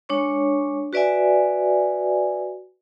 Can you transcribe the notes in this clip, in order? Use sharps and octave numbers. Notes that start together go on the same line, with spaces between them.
G#3 D4 C#5 C#6
F#4 B4 D5 E5 G#5